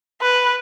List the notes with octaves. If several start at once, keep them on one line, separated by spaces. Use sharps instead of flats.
B4